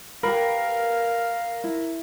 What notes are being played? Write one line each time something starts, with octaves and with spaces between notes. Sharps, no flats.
G4 A#4 B4 F5 B5
E4